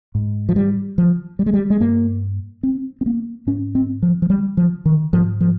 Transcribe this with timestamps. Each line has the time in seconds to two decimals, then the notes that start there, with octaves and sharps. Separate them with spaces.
0.15 G#2
0.49 F3
0.56 G3
0.98 F3
1.39 G3
1.46 G#3
1.54 G3
1.70 G#3
1.80 G2 A#3
2.63 C4
3.01 C4
3.06 A#3
3.47 G#2 C#4
3.75 C4
4.02 F3
4.22 F3
4.30 G3
4.57 F3
4.85 D#3
5.13 G#2 F3
5.41 F3